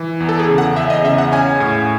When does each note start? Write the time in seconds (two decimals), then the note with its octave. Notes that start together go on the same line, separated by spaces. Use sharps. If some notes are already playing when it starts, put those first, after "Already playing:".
Already playing: E3
0.20 E2
0.29 A4
0.39 G#4
0.49 C#3
0.58 F#5
0.76 E2 E5
0.90 D#5
1.04 C#3 E5
1.18 F#5
1.32 C#4 G#5
1.60 A2